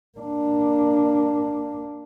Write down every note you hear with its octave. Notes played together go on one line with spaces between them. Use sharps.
A#3 D4